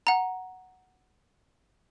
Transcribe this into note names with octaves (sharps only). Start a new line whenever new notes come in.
F#5 A#5